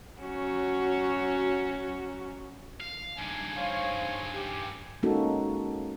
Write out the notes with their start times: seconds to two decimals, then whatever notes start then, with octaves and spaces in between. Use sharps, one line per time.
0.21 F#3 C#4 F#4
2.81 F5
3.18 G2 D#3 G#5
3.56 C5 C#5 F5
4.33 G4
5.03 G#3 A#3 C#4 D#4 F#4 A4